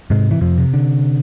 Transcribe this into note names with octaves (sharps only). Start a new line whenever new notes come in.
G#2 C3 G#3
E3
F2 F3
C3
D3